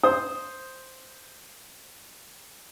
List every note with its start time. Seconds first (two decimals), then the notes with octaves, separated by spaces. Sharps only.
0.03 C5 D#6